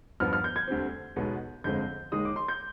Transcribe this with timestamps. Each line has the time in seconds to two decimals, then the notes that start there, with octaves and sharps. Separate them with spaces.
0.20 G2 F3 B3 F6
0.33 F6
0.44 G6
0.56 G#6
0.68 D2 D3 G3 C4
1.16 B1 B2 G#3 B3
1.64 G1 F2 D3 G#3 C4 G6
2.12 D#2 D#3 G#3 D#6
2.25 D6
2.36 C6
2.48 G6